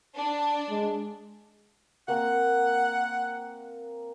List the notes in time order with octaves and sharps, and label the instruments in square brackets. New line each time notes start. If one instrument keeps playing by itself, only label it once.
[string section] D4
[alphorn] G#3
[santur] A#3 C4 [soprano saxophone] F#5